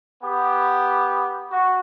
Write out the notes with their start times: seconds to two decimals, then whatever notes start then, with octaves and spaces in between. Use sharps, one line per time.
0.22 B3 G4
1.51 F#4